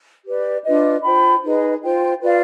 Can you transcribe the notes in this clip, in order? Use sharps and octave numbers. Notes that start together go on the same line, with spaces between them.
G4 B4 D5
D4 F4 B4 D#5
F4 C5 G5 B5
D#4 G#4 B4 D#5
F4 C5 G5
F4 B4 D5 F5